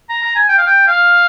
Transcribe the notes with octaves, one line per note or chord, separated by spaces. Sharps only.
A#5
A#5
G#5
G5
F5
G5
F5